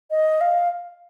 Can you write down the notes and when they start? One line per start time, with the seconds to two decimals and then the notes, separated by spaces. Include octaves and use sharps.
0.11 D#5
0.41 F5